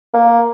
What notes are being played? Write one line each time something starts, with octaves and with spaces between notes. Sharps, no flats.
A#3